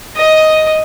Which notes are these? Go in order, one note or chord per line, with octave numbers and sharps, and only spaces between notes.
D#5 D#6